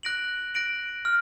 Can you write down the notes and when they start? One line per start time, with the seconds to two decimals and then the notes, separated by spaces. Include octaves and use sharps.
0.03 F#6 A#6 D7 F#7
0.54 F#6 A#6 D7 F#7
1.05 F6